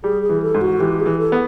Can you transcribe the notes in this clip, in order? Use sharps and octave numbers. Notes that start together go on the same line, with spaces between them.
G3 G#4
G#4
E3
A4
G#2
F#4
E3 G4
G#4
E3
A4
B3